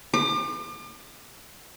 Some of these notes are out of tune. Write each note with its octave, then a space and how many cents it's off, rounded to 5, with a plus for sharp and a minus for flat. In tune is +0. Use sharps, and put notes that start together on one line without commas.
D6 +40